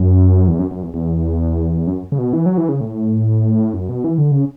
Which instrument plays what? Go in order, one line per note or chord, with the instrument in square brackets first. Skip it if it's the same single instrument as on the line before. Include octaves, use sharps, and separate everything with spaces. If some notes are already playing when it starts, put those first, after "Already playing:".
Already playing: [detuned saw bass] F#2
E2
F#2
F#2
E2
E2
F#2
C#3
B2
E3
F#3
E3
C#3
A2
F#2
B2
E3
D3
C#3